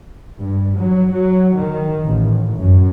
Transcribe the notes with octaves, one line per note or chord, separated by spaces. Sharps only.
G2
F#3
F#3
D#3
A1
F#2